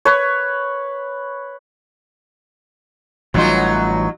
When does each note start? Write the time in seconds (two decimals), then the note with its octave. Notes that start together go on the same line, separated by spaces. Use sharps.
0.05 B4 C#5
3.34 A1 E3 F#3 G3 D#4 F4